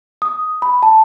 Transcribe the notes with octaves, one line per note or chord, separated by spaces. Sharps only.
D#6
B5
A5